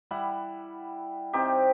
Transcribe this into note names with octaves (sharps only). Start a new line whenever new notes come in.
G3 E4 F#5
C3 C4 D#4 G4